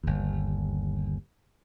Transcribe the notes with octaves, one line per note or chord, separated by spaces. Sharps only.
G1 D#2